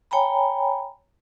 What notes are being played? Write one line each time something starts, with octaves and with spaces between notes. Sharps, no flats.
C#5 G5 G#5 A#5 B5